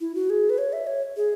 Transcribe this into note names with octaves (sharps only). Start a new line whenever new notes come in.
E4
F#4
G#4
B4
C#5
E5
C#5
G#4